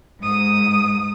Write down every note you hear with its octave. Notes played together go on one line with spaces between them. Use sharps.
G#2 D#6